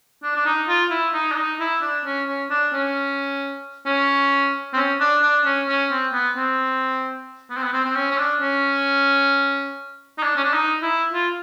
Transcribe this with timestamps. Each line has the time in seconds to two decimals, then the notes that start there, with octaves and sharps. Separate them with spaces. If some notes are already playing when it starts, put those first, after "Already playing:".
0.23 D4
0.35 D4
0.46 D#4
0.68 F4
0.90 E4
1.13 D#4
1.32 D4
1.37 D#4
1.60 E4
1.81 D4
2.05 C#4
2.27 C#4
2.50 D4
2.73 C#4
3.86 C#4
4.73 C4
4.76 C#4
5.00 D4
5.22 D4
5.45 C#4
5.69 C#4
5.91 C4
6.13 B3
6.36 C4
7.50 B3
7.57 C4
7.63 B3
7.73 C4
7.85 C4
7.96 C#4
8.11 C#4
8.18 D4
8.41 C#4
10.18 D#4
10.23 D4
10.36 C#4
10.44 D4
10.53 D#4
10.82 E4
11.12 F4